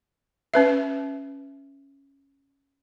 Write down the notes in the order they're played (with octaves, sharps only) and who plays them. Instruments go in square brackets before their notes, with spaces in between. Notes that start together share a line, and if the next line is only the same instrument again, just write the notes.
[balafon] C#4 B4 E5